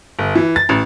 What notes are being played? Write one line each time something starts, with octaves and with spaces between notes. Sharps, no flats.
G1
E3
A6
A1